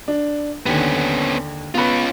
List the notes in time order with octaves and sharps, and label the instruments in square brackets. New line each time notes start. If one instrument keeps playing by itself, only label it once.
[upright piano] D4
[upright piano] D#2 D3 [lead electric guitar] B3 C#4
[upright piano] B3 B4 [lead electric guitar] C#4 F4